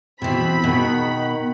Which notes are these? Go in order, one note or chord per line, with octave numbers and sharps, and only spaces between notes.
B2 E3 C4 B5
B2 D#3 D#4 F#5